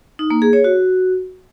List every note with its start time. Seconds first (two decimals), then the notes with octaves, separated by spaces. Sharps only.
0.19 D#4
0.30 A#3
0.42 G#4
0.53 C#5
0.64 F#4